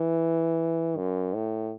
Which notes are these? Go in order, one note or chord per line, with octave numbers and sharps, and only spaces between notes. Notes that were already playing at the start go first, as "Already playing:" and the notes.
Already playing: E3
F#2
A2